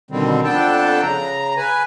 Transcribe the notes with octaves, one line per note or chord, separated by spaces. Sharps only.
B2 D3 D#3 G3 C4
F2 B3 D4 A4 G5 A5
C#3 A#5
B4 G#5